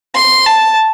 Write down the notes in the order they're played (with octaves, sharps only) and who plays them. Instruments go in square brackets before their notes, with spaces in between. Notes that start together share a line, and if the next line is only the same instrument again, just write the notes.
[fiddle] C6
A5